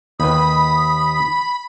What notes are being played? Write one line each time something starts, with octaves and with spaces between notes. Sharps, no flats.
D#2 B4 B5 D#6